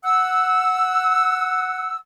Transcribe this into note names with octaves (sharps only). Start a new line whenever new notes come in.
F#5 E6